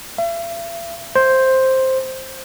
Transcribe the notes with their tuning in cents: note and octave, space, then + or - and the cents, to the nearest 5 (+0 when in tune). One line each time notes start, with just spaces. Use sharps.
E5 +45
C5 +5